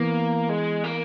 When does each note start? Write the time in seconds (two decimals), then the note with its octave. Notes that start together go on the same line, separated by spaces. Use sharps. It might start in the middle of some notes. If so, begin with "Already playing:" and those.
Already playing: E3 A#3 B3
0.49 G#3
0.84 A#3